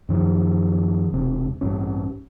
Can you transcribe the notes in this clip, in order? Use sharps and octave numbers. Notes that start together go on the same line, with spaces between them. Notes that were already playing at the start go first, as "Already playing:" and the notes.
F#2 D#3 F3
E1 C3
A1 G2 C#4